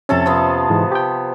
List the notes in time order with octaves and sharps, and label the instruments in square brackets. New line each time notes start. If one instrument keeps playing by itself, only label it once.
[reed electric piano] F2 C#4 [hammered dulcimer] C3 A4 A5
[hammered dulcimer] C3 F3 B3
[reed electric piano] G#2 E3 G#3
G4 G5